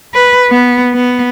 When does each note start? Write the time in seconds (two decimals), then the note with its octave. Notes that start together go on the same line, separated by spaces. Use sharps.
0.14 B4
0.50 B3
0.94 B3